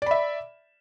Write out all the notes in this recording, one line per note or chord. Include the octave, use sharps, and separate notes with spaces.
D5 E5 B5